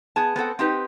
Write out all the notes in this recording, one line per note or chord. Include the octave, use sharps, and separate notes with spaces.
B3 G#4 A5
B3 C4 A4 F#5
C4 D#4 G4 B4